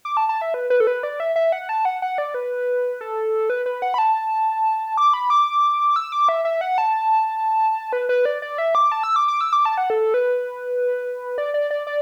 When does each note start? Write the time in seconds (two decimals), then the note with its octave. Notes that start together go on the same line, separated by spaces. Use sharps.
0.05 D6
0.17 A5
0.29 A5
0.41 E5
0.54 B4
0.70 B4
0.80 A4
0.87 B4
1.03 D5
1.20 E5
1.36 E5
1.52 F#5
1.69 A5
1.85 F#5
2.02 F#5
2.18 D5
2.34 B4
3.01 A4
3.50 B4
3.66 B4
3.82 F#5
3.94 B5
3.98 A5
4.98 D6
5.14 B5
5.30 D6
5.96 E6
6.12 D6
6.29 E5
6.45 E5
6.61 F#5
6.78 A5
7.93 B4
8.09 B4
8.25 D5
8.42 D5
8.58 E5
8.75 D6
8.92 A5
9.03 E6
9.16 D6
9.28 D6
9.41 E6
9.53 D6
9.65 A5
9.78 F#5
9.90 A4
10.14 B4
11.38 D5
11.54 D5
11.71 D5
11.87 D5